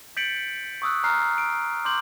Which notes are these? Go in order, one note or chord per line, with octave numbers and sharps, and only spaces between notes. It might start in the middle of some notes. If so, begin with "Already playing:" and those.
G6 A6 B6 C#7 D7 F#7
C#6 D#6 E6 F#6
A#5 F6 F#6 C7
D7
C6 D6 G6 F#7